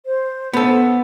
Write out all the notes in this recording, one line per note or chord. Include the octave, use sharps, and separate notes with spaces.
C5
B3 A4